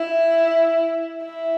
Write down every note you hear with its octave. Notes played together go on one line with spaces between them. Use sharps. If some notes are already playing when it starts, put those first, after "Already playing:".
Already playing: E4
E4